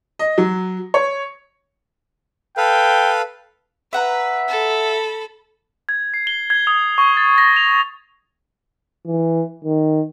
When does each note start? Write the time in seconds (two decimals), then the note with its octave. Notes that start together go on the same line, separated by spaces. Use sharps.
0.19 D#5
0.38 F#3
0.94 C#5
2.57 A4 B4 F5 G5
3.93 B4 E5 F#5 A#5
4.49 A4 B5
5.89 G#6
6.14 C7
6.27 G7
6.50 G#6
6.67 D#6
6.98 C#6
7.17 A6
7.38 A#6
7.56 F7
9.07 E3
9.65 D#3